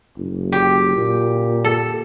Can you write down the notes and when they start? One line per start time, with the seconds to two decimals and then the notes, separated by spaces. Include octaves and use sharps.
0.17 F#1
0.52 G4
0.96 A#2
1.65 A4